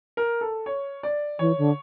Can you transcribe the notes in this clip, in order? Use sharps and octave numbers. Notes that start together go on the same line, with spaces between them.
A#4
A4
C#5
D5
E3 C#5
D3